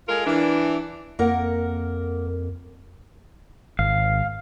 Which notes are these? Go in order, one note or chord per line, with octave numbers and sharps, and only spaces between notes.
G#3 F4 A4 A#4
E3 D4
F2 A#3 A#4 F#5
G#1 F5